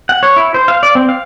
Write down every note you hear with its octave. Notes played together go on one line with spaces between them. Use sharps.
F#5
C#5
E4
C5
F5
D5
C4
F5